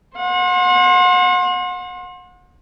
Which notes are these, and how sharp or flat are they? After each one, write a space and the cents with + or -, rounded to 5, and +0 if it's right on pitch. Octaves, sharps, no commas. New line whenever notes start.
C5 +30 F#5 -35